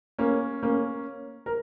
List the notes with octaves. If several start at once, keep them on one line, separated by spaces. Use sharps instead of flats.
A#3 C#4
A#3 C#4
A#4